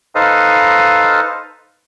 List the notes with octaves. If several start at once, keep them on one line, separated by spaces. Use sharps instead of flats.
D#4 A4 B4 C5 D#5 F5